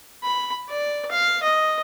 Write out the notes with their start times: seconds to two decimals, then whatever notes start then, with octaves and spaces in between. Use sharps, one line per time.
0.24 B5
0.70 D5
1.11 F5
1.43 D#5